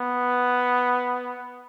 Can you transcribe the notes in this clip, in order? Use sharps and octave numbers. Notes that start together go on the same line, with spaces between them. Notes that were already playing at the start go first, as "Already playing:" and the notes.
Already playing: B3